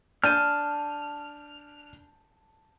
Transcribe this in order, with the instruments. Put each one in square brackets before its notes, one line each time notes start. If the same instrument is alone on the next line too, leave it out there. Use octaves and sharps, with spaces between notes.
[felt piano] D4 G6 D#7 [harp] A5 [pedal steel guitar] F6